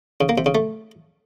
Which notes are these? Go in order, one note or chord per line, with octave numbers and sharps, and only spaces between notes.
C#3
A#3
C3
C#3
A3